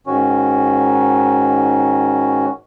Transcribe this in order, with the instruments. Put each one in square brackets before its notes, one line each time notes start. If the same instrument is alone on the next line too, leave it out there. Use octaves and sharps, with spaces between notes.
[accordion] G#2 D#3 C#4 F#4